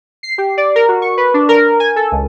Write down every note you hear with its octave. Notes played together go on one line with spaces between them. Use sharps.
C7
G4
D5
A#4
F#4
C#6
B4
D4
A#4
G#5
A4
C#2